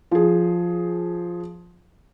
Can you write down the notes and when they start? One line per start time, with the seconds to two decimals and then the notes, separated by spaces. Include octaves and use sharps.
0.11 F3 G#4